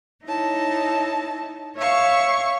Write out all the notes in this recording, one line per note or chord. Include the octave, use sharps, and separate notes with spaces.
D#4 E4 C#5 A5
C#5 E5 F5 C#6